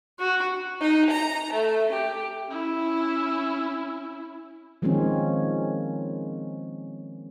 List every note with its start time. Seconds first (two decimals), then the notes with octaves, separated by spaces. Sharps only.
0.19 F#4
0.80 D#4
1.10 A#5
1.52 A3
1.92 G4
2.49 C#4 E4
4.82 D#3 F3 G#3 A#3 C4 C#4